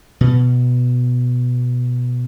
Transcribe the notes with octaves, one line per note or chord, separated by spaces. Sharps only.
B2 B3